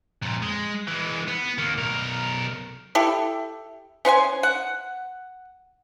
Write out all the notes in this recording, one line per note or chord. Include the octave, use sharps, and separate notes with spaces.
F2 A#2
G#3
E3 G#3
B3
D#3 A#3
B1 A#4
E4 G4 A4
C#4 C5 F#5 G#5
F#5